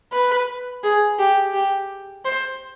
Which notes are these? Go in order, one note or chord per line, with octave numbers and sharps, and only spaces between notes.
B4
G#4
G4
G4
C5